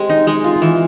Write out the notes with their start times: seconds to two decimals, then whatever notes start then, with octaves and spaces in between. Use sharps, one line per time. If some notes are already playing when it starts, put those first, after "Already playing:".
Already playing: G#3 C4 G4
0.09 D#4
0.27 G#3
0.44 F4
0.62 E3